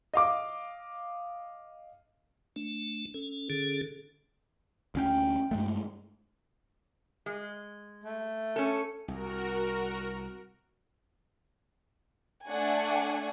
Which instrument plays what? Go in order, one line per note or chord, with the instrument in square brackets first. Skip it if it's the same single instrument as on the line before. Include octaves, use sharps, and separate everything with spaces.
[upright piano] D#5 F5 D6
[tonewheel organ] A3 D4
C#4 A4
D3 C#4 G#4 A4
[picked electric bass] D2 C#4 [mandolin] F5 G5
[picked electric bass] G2 G#3 A3
[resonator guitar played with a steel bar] G#3
[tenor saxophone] A3
[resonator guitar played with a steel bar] C#4 A4
[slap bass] C2 [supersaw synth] F#4 A#4
[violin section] A3 D4 D5 F#5 G#5